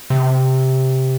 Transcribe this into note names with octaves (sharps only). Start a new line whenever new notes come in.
C3